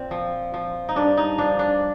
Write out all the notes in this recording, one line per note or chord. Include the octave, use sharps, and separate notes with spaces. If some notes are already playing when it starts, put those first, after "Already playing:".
Already playing: A#2 C4
F3
F3
D#4
G2 D4
D#4
F3 D4
D4